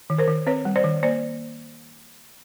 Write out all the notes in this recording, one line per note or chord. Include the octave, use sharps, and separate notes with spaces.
D#3
A#4 C5
D#3
C4 B4 C#5
G3
C5 D5
D#3
A#3 C5 D5